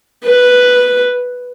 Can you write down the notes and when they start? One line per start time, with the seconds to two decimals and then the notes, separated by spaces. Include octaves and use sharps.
0.25 B4